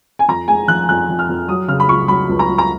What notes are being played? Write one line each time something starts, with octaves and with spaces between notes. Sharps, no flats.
G#5
F2 A#5
G#3 G#5
F3 F#6
F2 F#6
F2
F6
F2
F#3 D#6
C#3 F6
B5
C#2 C#6
F#3 B5
C#2
A#5
C#2
A#5